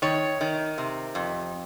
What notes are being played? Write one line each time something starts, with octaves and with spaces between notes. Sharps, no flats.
D#3 C#5
D#3
C3
F2